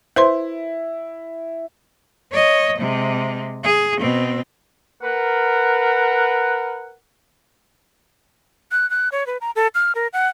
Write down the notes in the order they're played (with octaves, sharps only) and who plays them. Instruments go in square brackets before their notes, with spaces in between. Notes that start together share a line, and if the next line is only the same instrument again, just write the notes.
[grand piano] E4 [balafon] B4 C5 C6
[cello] C#5 D#5
C3 G#3
G#4
B2 C4
[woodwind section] A#4 B4 F#5
[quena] F#6
F#6
C#5
B4
A#5
A4
F6
A#4
F#5